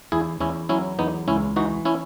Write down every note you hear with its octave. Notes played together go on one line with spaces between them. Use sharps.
E2 E4 G#4
E2 C#4 E4
F#3 C#4 E4
E2 B3 D#4
C#2 C#4 E4
E3 D#4 F#4
C#4 E4